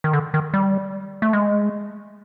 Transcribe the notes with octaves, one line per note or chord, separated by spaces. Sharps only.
D#3
D3
D#3
G3
A3
G#3